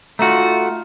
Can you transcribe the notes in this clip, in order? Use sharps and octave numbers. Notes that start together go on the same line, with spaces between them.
A3 D#4 F4 F#4